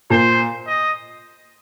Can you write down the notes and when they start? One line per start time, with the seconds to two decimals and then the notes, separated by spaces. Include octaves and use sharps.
0.10 A#2 C5
0.67 D#5